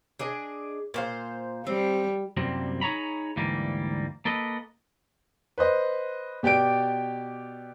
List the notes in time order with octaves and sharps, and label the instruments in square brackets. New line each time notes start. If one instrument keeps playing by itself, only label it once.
[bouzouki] D4 G#4 D#5
A#2 C5 F5
[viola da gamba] G3 [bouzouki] C4
[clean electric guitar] C2 F#2 C3 G3 A#3 C4
D#4 G#4 C#5 A#5 B5
D2 G#2 E3 G3 A#3
A#3 A4 B4 D#5
[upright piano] B4 C5 D#5
B2 G4 D5 G5 D7